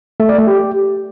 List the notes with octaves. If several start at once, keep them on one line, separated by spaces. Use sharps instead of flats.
A3
D5
A3
G4